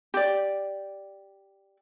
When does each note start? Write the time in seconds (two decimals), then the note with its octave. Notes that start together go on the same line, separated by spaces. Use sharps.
0.14 G4 D5